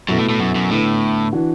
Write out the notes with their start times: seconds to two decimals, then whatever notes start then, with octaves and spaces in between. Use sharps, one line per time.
0.09 F#2 B2 B3 E4 A4
0.19 A2
0.29 A2
0.39 F#2
0.55 F#2
0.71 A2 D3 B3 E4 B4
1.33 E3 D4 F#4